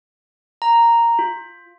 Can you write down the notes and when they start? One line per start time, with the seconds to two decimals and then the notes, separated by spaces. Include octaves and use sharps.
0.62 A#5
1.19 F4